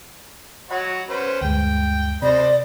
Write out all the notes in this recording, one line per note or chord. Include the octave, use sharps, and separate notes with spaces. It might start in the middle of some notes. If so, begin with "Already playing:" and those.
F#3 F#4 C#5 D#5 F#5 B5
C#4 B4 C5
D2 G2 G#3 G5
C3 C5 D5 D#5 B5